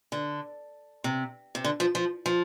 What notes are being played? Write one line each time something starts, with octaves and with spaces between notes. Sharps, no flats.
D3
C3
C3
D3
F3
F3
F3